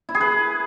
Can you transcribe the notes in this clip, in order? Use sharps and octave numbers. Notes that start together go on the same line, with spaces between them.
E4
G#4
B4